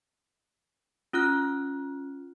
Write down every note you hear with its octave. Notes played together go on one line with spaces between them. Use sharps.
C#4 F4 F6 F#6